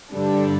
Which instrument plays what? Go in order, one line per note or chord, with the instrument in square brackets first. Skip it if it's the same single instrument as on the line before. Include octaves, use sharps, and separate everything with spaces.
[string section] G2 D3 G3 D4 A4